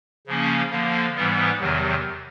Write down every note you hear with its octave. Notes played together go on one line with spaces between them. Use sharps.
C#3 F3 A#3 C#4
D3 F3 A#3
G#2 E3 G3 B3
E2 C3 D#3 F#3